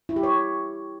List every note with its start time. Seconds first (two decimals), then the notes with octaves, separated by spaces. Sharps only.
0.09 E4
0.16 G4
0.23 C#5